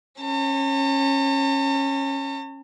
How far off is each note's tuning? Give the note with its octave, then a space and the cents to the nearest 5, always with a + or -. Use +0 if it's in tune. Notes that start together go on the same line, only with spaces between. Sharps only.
C#4 -20 A5 +45